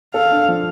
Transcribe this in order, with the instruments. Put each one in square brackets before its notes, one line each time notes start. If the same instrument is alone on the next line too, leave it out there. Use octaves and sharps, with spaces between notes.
[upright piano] A4 [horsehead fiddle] F5
[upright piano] D4
F3